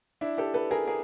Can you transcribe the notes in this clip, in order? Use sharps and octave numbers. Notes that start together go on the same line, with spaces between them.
D4 E4
G4 A4
A4 B4
G#4 A#4
G#4 A#4